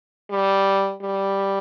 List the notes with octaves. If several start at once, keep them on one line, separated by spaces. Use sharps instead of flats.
G3
G3